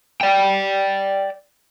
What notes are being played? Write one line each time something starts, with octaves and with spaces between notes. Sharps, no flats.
D5 G5